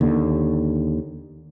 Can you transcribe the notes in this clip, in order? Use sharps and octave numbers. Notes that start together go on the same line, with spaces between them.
D#2 D3